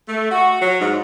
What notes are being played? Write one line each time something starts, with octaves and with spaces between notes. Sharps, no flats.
A3
F#4
F#3
G#2